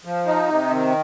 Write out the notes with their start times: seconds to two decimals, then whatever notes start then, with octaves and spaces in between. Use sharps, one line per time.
0.05 F3
0.27 D#4
0.48 C3
0.70 D#3